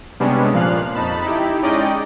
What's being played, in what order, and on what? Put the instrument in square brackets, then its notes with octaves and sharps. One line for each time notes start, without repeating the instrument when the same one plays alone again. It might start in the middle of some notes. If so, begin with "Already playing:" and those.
[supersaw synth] C3 G3 G#3 B3 C#4 D4
A#2 F3 F5 F#6
F2 D#4 A5 B5
D#4 E4 G4
G#3 C#4 D#4 D5 D#5 G5